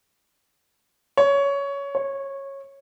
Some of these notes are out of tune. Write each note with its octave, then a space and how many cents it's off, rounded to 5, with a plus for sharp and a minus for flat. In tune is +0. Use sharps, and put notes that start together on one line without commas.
C#5 +15
C#5 -15